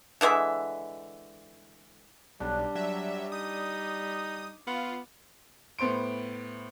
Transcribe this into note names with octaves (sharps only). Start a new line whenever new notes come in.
D3 E3 G#3 E5
B1 G3 D4
F#3 E5
D#4 D#6
B3 F4
A2 B3 C5 C6 D7